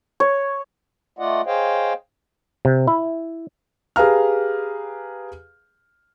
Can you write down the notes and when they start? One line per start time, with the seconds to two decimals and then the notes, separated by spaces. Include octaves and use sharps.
0.20 C#5
1.19 A3 F4 D5 D#5 F#5
1.46 G#4 C5 C#5 D#5 F5 G5
2.65 C3
2.87 E4
3.96 G4 G#4 B4 F5 A#5 F6